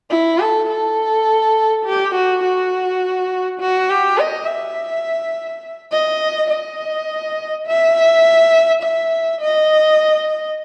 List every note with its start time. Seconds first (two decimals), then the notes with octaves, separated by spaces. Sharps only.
0.10 E4
0.39 A4
0.69 A4
1.85 G4
2.15 F#4
2.43 F#4
3.60 F#4
3.89 G4
4.18 D#5
4.46 E5
5.92 D#5
6.50 D#5
7.66 E5
8.82 E5
9.41 D#5